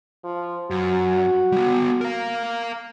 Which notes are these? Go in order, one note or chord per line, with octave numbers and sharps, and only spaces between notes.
F3
F#2 F#4
G3 B3
A#4 F5